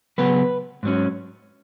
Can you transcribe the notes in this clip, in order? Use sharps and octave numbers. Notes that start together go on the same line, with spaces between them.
C#3 F#3 B3 B4
G#2 F#3 C#4